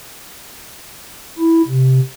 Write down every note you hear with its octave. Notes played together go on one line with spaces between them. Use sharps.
E4
C3